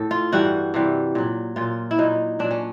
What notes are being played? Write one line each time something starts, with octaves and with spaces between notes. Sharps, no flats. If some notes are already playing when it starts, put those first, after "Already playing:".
Already playing: A2 A4
F4
G2 E3 G3 F#4
C3 E3 G3
A#2 F#3
A#2 F#3 F4
E4
A#2 F#3 D#4
A#2 F#3 D4
C#4